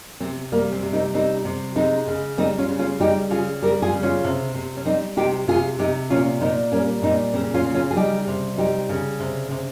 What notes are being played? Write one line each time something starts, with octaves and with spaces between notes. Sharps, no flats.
C3 C4
G3 A#3
C4
C3
C4 D#4
G3 C4 D#4
C3
G#3 C4 D#4
C#3
G3 C4 D#4
C#4 F4
C#3
C#4 F4
G3 D#4 G4
C#3 F4 G#4
G3 G4 A#4
F4 G#4
C#3
C#4 F4
C3
C3
C#4
G3 C4 D#4
C3 D#4 G4
C3 F4 G#4
C3 D#4 G4
A#2 C#4 F4
A#2 C4 D#4
G3 A#3 C#4
A#2 C4 D#4
C#3 C4
C#4 F4
C#3
C#4 F4
G#4
G3 D#4 G4
C3
G3 D#4 G4
C#3
C3
C3